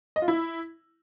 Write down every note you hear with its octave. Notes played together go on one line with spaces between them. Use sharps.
D#5
F4
E4